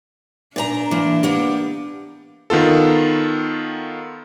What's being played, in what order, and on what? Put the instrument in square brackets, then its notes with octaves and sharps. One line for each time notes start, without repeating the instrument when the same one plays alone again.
[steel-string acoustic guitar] A#2 B4 A#5 [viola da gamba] D4
[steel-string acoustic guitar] E3 A#3
A#3 B3 G4
[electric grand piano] D#3 B3 F4 A4